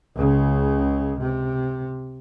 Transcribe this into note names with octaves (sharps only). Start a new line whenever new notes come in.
C#2 C#3
C3